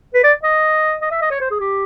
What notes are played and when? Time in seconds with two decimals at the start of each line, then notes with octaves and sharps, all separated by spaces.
0.14 B4
0.24 D5
0.43 D#5
1.02 D#5
1.11 E5
1.21 D#5
1.31 C#5
1.40 C5
1.51 G#4
1.60 G4